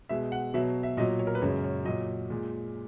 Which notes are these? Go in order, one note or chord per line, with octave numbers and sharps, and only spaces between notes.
B2 G#3 E5
F#5
B2 F#3 E5
E5
A#2 F#3 D#5
C#5
A#4
B4
F#2 C#3 G#3 C#5
C#5
A#2 F#3 D#5
A#2 G#3